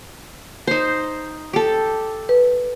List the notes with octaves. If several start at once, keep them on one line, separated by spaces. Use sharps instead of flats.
D#4 C5
G4 A4
B4